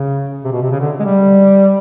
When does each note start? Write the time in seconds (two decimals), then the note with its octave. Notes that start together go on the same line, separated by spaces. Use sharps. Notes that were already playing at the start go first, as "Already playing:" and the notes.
Already playing: C#3
0.44 C3
0.52 B2
0.62 C3
0.71 C#3
0.80 D3
1.00 G#3
1.05 G3